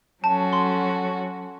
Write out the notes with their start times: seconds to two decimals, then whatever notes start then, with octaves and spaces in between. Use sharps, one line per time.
0.24 F#3 C#4 F#4 A4 A5
0.53 C6